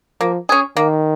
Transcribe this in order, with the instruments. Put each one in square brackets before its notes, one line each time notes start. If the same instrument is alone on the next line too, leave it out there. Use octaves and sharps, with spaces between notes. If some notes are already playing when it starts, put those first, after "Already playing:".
[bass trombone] F3 [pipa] A#3
[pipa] C#4 G#4
[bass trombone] D#3 [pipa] A#3